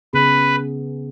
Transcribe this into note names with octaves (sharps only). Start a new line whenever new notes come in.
C#3 B3 G#4 B4